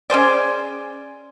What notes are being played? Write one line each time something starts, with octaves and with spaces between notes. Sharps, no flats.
C#4 G#4 C5 D5